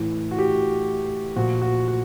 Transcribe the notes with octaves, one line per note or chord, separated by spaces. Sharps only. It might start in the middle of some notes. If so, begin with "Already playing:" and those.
Already playing: A2 E3
F#4
G4
A#2 F3 F#4
F#4
F#4